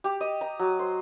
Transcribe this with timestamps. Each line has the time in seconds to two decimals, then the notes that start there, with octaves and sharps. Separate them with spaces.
0.04 G4
0.21 D#5
0.41 A#5
0.59 F#3
0.79 C5